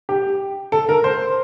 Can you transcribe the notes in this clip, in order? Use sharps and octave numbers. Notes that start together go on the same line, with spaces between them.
G4
A4
A#4
C5